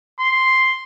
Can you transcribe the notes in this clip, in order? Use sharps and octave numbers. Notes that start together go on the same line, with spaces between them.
C6